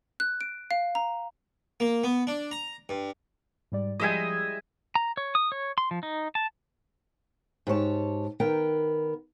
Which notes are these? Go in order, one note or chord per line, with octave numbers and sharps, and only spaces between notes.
F#6
D7
F5
A#5
A#3
B3
D4
A#5
G2
G#2 G3 D5
F3 G3 G#3 E4 D#5 E5 G#5 G6
A#5
C#5
D#6
C#5
C6
F3
D#4
A5
G#2 G4 C#5 A5
D#3 B3 A#4 G5